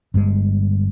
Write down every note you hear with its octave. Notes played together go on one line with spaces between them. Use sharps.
G1 G2 G#3